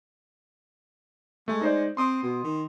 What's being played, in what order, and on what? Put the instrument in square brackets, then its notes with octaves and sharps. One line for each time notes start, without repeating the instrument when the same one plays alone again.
[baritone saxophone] G#3 [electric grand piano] A3
[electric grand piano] D#4 C5 D5
[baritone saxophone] C4 [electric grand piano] C6 D#6
[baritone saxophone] B2
D#3